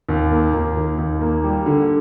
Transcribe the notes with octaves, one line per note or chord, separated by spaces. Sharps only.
D#2
A#3
D#2
D#3
D#2
A#3
G3
D3